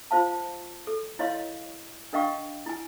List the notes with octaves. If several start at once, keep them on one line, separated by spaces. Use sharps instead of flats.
F4 C5 F5 A5
A4
E4 C#5 D#5 F5 C6
D4 A#4 D#5 F5 G5 C#6
E4 G#5